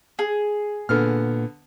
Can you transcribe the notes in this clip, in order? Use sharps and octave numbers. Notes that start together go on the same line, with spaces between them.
G#4
A#2 D3 B3 F6